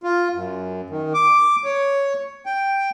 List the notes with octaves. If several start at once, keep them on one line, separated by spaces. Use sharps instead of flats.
F4
F#2
D#3
D6
C#5
G5